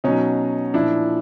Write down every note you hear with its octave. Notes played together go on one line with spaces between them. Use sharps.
B2 F#3 C#4 D#4
A#2 F3 D4 E4